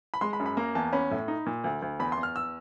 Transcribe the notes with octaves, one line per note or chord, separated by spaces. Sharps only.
B5
G#3 C6
B5
F#2
B5
A#3 A#5
E2 A5
C#4 B5
A2
D#4
A#2
D2
D2
E2 B5
C6
E2
F6
E6